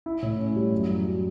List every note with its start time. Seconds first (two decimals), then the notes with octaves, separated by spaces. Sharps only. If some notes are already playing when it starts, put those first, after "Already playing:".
0.06 E4
0.22 A2
0.39 C#4
0.56 G3
0.72 F#2
0.89 F#2
1.06 F#3